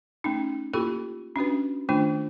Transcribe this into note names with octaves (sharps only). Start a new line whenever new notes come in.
A3 C#4 D#4
A#3 E4 F4 G4 A4 B5
C#4 D4 F#4 B4
D#3 A3 D4 F4